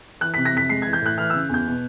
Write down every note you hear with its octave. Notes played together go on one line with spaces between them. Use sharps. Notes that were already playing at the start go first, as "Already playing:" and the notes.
E3 F#6
C3 B6
A#6
F2 B6
G#3 C7
G#6
E3
G6
A2 F#6
E3 F6
E6
C#3
E2 G6
B2